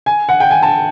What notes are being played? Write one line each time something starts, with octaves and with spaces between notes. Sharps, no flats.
G#5
F#5
G5
G#5
A5